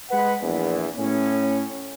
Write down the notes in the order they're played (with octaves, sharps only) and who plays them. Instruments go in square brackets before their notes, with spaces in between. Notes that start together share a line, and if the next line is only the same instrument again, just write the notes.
[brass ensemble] G#3 B4 F#5
A#1 E2
A2 C#4